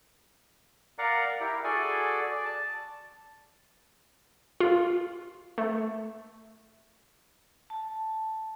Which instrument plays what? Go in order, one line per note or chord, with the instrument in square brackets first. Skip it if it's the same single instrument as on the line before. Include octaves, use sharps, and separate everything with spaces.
[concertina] A#4 D5 F5 F#5 A#5
E4 G4 A#4
F#4 G#4 A4 D5 G#5
D5
A5
[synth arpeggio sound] F4
A3
[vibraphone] A5